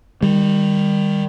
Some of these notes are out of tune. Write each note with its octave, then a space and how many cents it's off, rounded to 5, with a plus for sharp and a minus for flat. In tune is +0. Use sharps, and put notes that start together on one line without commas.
D#3 -5 G3 +25